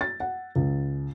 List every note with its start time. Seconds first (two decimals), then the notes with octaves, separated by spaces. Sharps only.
0.01 A6
0.20 F#5
0.56 C#2